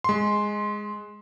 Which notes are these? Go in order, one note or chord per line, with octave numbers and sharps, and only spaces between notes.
G#3 C6